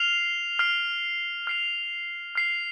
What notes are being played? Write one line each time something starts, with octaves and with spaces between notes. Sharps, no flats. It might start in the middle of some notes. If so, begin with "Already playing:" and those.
Already playing: F6 C7 F7
F6 C7 F7
F6 C7 F7
F6 C7 F7